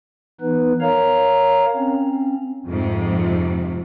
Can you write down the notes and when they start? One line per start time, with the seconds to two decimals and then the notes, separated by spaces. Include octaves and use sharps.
0.41 E3 B3 D#4 B4
0.81 A#4 C#5 F5 A#5
1.75 C4 C#4
2.67 F2 G#2 C3